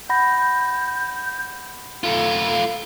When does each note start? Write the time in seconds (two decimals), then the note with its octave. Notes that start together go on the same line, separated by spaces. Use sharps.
0.09 F#5 B5 G6 A#6
2.04 A3 F4 A4